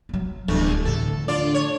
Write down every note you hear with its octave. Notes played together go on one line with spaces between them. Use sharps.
F#3 A#3
D1 E2 G2 A3
A2 D3 A4
D4 F4 D5
C#5